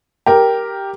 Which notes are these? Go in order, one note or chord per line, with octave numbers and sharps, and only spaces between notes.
G4 A#4